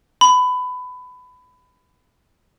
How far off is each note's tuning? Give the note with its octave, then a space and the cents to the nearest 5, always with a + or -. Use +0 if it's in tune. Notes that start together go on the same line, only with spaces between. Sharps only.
B5 +20